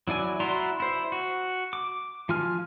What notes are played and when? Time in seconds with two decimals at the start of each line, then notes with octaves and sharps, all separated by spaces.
0.08 F#3 E4 D5 G#5
0.40 E4 F#4 D5 A#5 C6
0.80 E4 C5
1.12 F#4
1.73 D6
2.29 F3 F4 G#5 F6